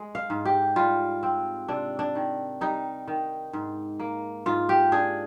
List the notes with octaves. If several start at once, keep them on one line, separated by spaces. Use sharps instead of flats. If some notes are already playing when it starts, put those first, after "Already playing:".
Already playing: G#3
F5
G#2
G4
G3 F4
C4
C3 D4
D4
D#3
G3 D#4
D#3
G#2
A#3
G#2 F4
G4
D4 G#4